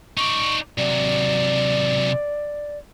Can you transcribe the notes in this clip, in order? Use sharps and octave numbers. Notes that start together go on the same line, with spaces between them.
D#4 D5 C#6
C3 F#3 D5